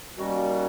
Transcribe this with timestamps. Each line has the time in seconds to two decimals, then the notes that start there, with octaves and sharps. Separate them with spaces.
0.17 D#2 D#3 G3 A#3 C#4 F#4